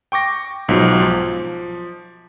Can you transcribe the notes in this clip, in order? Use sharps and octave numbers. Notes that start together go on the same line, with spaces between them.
G5 C#6 D6 A#6
B1 G#2 F3 F#3
F3